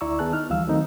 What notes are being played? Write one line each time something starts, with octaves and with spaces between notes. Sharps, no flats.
D2 E4 D5 A#5 C#6 E6
D#3 B3 G#4 A5 F#6
D#4 F6
D2 E3 F3 G3 F5 E6
D#3 F#3 A3 C4 D#4